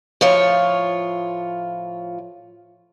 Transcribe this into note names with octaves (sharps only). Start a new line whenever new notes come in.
A2 F3 F4 C#5